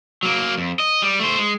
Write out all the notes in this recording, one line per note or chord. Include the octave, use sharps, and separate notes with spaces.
F#3 A#3
F2
D#5
G3
A3 C5
G#3